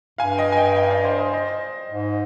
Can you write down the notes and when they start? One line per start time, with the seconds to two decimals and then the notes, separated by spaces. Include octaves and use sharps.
0.18 G2 F5 G#5
0.37 D#5 G5
0.52 G#5
0.57 D#5 G5
0.76 D#5 G5
0.90 D5 F5
1.04 C5 D#5
1.19 C5 D#5
1.34 C5 D#5
1.90 G#2